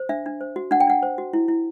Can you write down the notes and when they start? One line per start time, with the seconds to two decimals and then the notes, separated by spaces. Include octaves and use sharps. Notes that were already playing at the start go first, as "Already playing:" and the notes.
Already playing: C5
0.09 D4 E5
0.26 D4
0.41 C5
0.56 F#4
0.71 D4 F#5
0.80 G5
0.87 D4 F#5
1.03 C5
1.18 F#4
1.33 E4
1.48 E4